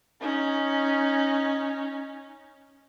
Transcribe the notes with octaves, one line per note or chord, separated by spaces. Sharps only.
C#4 D#4